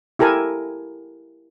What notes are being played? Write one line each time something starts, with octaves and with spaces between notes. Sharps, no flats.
E4 G4 A4 A#4 G#5